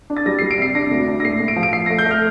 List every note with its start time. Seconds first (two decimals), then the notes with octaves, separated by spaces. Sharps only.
0.10 D4
0.17 A6
0.26 G3 A#6
0.39 C7
0.42 G3
0.51 D7
0.59 C3 C7
0.75 D4 A#6
0.91 D2
1.08 D4
1.20 A#6
1.25 A2 C7
1.40 A2
1.48 D7
1.56 F3
1.63 D7
1.73 F3 C7
1.86 A#6
1.90 A3
1.98 G6
2.06 A3
2.11 F6